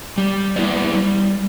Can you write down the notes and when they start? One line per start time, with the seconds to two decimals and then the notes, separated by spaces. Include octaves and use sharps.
0.18 G3
0.56 B3 E4 B4 D5
0.95 G3